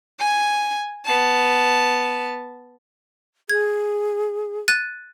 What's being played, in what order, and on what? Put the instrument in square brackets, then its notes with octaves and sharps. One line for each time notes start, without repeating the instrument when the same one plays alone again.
[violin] G#5 G#6
B3 A5
[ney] G#4 [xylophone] G#6
[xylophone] F#6 A6 D#7